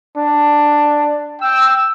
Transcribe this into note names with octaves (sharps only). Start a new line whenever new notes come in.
D4
G5 E6